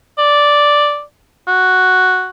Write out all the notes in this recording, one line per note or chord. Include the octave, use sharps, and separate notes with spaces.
D5
F#4